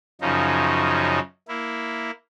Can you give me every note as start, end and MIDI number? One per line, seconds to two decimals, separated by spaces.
0.21 1.19 42
0.21 1.19 49
0.21 1.19 53
0.21 1.19 63
1.48 2.11 58
1.48 2.11 64